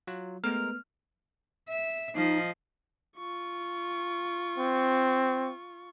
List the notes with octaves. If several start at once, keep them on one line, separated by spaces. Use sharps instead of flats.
F#3 F4
G#3 A3 B3 A#4 F6
E5
F3 D#4 D#5
F4 C#6
C4